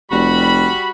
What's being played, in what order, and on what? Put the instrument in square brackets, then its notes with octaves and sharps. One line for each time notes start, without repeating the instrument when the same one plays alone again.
[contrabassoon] F1 [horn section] G3 F#4 B5